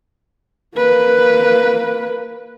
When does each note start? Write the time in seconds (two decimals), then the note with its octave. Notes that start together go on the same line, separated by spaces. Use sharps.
0.76 A#3 B4